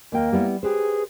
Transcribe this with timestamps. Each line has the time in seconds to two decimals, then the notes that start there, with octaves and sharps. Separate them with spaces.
0.12 D#2 A#3 G5
0.32 G3 B3 E4
0.63 G4 G#4 B4 C5